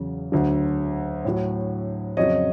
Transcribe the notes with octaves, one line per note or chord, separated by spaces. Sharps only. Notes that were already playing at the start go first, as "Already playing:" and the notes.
Already playing: E2 C#3 F#3
D2 D3 F#3
A2 F#3
F2 C#3 F#3 C#5 D#5